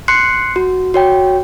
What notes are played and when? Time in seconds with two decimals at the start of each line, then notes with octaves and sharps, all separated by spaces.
0.08 C6 F#6 C7 C#7
0.56 F#4
0.94 F#4 C#5 G5